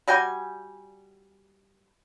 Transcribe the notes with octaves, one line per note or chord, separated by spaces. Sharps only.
G3 F#4 G5 G#5